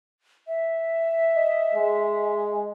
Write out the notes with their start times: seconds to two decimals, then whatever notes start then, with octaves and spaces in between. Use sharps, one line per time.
0.48 E5
1.36 D#5
1.75 G#3